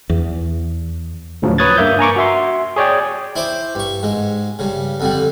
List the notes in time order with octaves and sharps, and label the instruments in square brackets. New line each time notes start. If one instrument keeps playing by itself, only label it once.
[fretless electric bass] E2
[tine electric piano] D2 A2 C#3 F3 F#3
B4 C#5 D#6 F#6 G#6 A6
G2 A#3 E5 G6
G#5 A#5 C#6 D6
F#4 E5 C6
G#4 C#5 D5 G5
[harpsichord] E4 C5 D6
G2 C#6
G#2 G#3
G2 C#3
F2 D3 G3